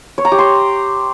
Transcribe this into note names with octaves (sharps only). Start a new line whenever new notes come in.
C#5
A#5
G4
C6